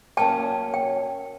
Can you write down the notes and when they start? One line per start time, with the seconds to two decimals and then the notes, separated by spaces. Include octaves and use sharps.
0.17 F#3 A#3 C#4 G5 A5
0.74 G5